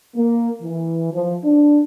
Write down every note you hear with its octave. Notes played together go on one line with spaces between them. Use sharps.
A#3
E3
F3
D4